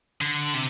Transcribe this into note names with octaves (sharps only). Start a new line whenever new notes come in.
D3
C3